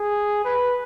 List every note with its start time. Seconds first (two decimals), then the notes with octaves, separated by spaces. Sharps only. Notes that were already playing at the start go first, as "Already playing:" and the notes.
Already playing: G#4
0.45 B4